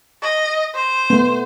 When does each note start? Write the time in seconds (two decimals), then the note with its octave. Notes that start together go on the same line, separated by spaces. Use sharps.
0.22 D#5
0.75 C5
1.10 A3 B3